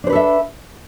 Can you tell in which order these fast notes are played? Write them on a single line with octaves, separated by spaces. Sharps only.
D4 C5 B4 A4 E5